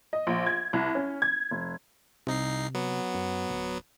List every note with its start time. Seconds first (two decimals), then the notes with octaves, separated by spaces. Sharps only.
0.13 D#5
0.27 A#1
0.46 G#6
0.73 C2
0.95 C#4
1.22 G#6
1.51 F1
2.27 C2 C3 D#4 C7
2.75 F#3 B3
3.14 F#2
3.50 D1